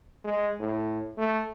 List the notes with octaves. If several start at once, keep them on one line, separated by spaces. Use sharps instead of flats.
G#3
A2
A3